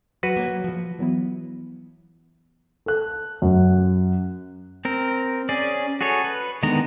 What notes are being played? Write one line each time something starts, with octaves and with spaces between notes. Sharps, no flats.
F#3 F#4 B4
A#3 C#5
F#3
F3
E3 F#3 B3 E4
A4 F#6
F#2
C4 A#4
C#4 G#4 D5
F#4 G#4 A4 C#5
B4
D3 D#3 G#3 B3 A#5